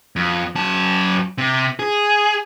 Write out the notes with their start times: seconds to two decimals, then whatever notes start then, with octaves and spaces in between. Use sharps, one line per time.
0.16 F2
0.55 F#2 A5
1.38 C3
1.79 G#4